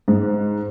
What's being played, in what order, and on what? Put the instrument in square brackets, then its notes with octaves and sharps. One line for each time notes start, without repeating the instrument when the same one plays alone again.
[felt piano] G#2